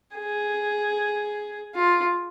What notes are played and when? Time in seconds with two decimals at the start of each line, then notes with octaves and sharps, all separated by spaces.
0.17 G#4
1.75 F4